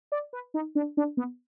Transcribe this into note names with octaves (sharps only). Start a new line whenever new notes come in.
D5
B4
D#4
D4
D4
B3